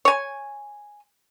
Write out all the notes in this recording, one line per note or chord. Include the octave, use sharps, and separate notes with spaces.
C#5 G#5